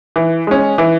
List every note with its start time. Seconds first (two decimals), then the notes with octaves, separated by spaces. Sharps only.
0.16 E3
0.47 G#3 C#4
0.78 E3